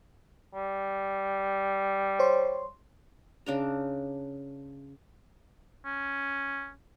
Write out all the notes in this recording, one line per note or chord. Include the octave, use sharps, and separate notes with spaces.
G3
C5 C#5 C6
C#3 D4 A#5
C#4